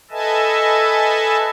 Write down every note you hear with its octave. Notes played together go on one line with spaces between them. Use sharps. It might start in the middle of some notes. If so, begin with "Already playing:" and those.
A4 B4 D#5 E5 G#5 A5